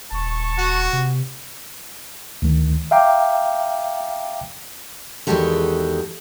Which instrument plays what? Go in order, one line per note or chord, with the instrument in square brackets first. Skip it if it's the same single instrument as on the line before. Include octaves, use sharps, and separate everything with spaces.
[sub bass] D#1 [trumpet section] A5 C#6
[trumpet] F#4
[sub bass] C3
[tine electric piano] D2 D#3
E5 F5 G5 A#5 D6
[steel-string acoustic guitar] E2 D#3 G#3 F#4 G4 A4